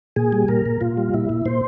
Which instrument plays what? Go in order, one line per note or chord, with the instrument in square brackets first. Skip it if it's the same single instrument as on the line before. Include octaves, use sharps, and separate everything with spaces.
[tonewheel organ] A#2 G#4
G3
A#2 A#4
A#2
A#2 F4
G3
A#2 E4
A#2
A#2 C5